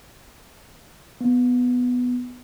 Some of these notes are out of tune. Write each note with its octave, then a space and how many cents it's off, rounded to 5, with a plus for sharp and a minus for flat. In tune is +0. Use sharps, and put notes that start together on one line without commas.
B3 +5